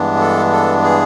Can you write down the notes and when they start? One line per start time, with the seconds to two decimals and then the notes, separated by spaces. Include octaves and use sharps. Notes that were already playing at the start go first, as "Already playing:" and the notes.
Already playing: G2 E3 G#3 B3 D4
0.20 A4
0.52 A4
0.82 G#4